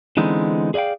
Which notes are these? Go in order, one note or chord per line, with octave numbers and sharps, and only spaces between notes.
D3 E3 G#3 B3 C4 D#4
G#4 D5 D#5 F5 G5